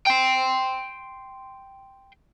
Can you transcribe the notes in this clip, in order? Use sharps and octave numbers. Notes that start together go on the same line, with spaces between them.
G5 C6